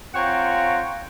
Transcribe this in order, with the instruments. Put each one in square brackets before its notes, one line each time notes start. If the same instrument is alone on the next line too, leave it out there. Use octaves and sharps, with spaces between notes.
[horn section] C4 F4 C#5 F#5 G5 A#5